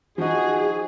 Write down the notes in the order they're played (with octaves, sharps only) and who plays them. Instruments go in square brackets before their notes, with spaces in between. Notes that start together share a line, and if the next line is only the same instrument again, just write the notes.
[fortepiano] F3 D#4 [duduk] F#4 [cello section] G#4